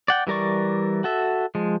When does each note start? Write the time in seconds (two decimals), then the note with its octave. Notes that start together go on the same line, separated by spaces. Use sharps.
0.08 D5 F#5 G5
0.27 E3 G3 A#4 D5 C#6
1.04 F#4 A4 E5
1.55 F3 G#3